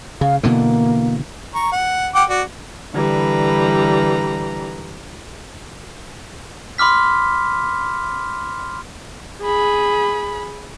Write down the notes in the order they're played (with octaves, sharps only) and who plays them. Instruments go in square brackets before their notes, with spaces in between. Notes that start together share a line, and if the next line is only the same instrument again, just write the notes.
[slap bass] C#3 [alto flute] F5
[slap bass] B2 D3 E3 [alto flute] A#3
[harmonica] A#5 C#6
F#5
F#5 G5 D6
F#4 D5
[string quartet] D3 E3 G3 B4 A#5
[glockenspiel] B5 C6 D6 F6 B6
[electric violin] G#4 B5